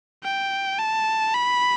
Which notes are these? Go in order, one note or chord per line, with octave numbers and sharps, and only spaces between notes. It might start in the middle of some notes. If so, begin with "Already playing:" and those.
G5
A5
B5